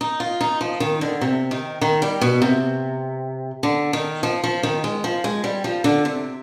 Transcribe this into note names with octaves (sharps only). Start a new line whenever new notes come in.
D#4
F4
D#4
F3
D#3
D3
C3
D#3
D#3
G3
B2
C3
D3
D#3
F3
F3
D#3
G#3
F3
G#3
G3
F3
D3
C3